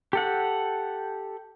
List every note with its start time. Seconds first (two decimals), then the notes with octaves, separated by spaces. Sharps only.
0.13 G4 A4 F#5